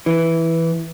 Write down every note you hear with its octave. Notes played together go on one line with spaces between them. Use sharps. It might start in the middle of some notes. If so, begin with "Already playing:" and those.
E3